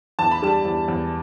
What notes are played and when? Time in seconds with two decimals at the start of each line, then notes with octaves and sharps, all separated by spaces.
0.19 E2 A5
0.31 B5
0.42 G3 A5
0.65 E2
0.88 E2